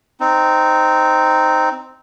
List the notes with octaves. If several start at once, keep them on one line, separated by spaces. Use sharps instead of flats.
C4 D#4